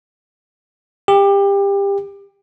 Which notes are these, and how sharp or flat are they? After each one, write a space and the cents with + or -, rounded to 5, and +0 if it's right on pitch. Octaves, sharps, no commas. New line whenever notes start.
G4 +25